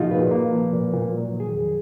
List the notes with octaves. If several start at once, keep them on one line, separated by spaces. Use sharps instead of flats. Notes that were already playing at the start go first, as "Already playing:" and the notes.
Already playing: A#2 F3 A#3 D#4 F4 F#4 G#4
A#2 B4
A#3
F3
A#2
A#2
F#3
D#3
G#4
F2